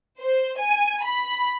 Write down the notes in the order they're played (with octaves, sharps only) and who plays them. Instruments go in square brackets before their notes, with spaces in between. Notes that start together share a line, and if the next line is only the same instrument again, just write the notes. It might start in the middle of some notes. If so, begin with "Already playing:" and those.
[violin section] C5
G#5
B5